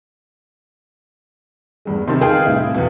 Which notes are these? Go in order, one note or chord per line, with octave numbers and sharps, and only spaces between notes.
E2 G2 G#3
C3 D#3 D#5 A5 C6
F4 G#4 B4 F5 G5
C2 A2 C3 E4
E2 B2 D3